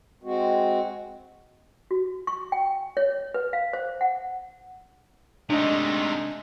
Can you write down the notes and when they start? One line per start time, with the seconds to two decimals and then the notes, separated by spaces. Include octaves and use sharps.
0.24 G#3 C4 F#4
1.91 F#4
2.27 C#6
2.52 G5
2.97 C#5
3.34 B4
3.53 F5
3.73 C5
4.01 F#5
5.49 C3 G#3 A3 D4 D#4 D#5